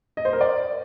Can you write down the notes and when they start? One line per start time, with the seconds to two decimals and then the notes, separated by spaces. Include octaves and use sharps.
0.17 D#5
0.25 C5
0.33 A#4
0.41 D5